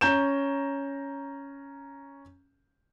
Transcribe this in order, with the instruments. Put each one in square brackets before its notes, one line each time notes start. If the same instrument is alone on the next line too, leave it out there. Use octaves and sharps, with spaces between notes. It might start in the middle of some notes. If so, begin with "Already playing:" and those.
[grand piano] C#4 A#5 G6 E7